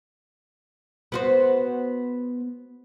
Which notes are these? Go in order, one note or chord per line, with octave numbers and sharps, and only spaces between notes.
B3 F#4 C5